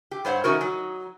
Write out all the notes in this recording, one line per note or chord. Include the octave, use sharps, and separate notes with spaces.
G4
G2 C5 C#5 F#5
D#3 A3 C#4 D#4 F#4 A#4
F#3 D#4